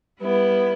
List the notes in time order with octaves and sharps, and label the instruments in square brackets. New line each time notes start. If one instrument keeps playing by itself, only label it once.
[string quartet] G3 B3 E4